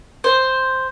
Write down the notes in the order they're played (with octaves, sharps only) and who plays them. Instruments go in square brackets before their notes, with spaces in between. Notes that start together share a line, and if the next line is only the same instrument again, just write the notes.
[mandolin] C5